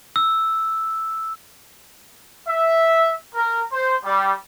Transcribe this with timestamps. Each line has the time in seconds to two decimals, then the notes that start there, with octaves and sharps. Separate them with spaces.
0.16 E6
2.48 E5
3.35 A#4
3.72 C5
4.05 G3